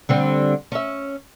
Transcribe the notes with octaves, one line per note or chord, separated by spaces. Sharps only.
D3 G3 C4
C#4 E5